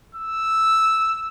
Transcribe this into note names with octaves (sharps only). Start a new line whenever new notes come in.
E6